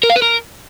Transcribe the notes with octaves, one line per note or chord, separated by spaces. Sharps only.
A#4
F5
B4
A#4